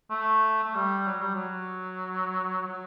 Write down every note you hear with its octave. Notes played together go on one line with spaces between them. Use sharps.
A3
A3
G3
F#3
G3
F#3
F#3